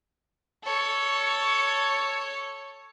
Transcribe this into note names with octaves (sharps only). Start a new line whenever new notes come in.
A4 C#5